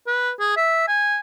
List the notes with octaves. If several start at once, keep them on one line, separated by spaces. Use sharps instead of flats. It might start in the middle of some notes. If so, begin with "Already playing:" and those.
B4
G#4
E5
G#5